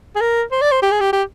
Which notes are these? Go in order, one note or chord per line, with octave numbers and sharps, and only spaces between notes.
G#4
A#4
C5
D5
C5
G4
G#4
G4
G4